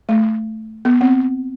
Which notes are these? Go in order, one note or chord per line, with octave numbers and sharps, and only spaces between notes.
A3
B3
C4